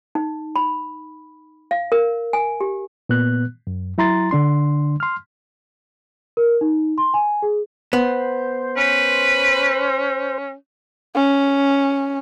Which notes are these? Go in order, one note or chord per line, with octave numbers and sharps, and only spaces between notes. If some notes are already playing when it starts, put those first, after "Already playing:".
D#4
B5
F5
A#4
G#5
G4
A#2 B3 F#6
F#2
F#3 E4 A#5 C6 A6
D3 D4 C6
C6 F6
A#4
D#4
C6
G#5
G#4
B3 C5
C#4 B4
C#4